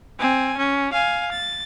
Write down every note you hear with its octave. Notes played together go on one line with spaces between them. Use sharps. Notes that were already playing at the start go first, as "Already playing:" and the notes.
C4 G#5
C#4
F5 G#5
A6